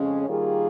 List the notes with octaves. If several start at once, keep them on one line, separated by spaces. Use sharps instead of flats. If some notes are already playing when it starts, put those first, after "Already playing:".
Already playing: F2 C#3 G#3 C#4
D#3 G3 A#3 F4 G#4